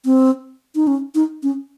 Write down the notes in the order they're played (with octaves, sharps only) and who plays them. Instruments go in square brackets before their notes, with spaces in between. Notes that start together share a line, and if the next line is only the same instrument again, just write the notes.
[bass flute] C4
D#4
C#4
D#4
C#4